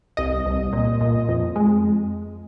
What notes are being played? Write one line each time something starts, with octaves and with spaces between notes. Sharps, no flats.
C2 D#5
C2
A#2
A#2
F2
G#3